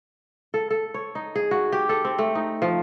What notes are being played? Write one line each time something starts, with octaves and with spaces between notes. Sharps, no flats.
A4
A4
C#5
D#4
G#4
F#4
G4
A4
C4
A3
D#4
F3